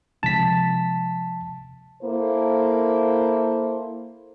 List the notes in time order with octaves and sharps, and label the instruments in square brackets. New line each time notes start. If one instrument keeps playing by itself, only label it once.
[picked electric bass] C3 F3 G#3 [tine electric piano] A5 B6
[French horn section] A#3 E4 A4 A#4 C5